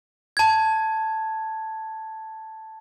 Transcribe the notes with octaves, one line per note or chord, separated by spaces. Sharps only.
A5 G#6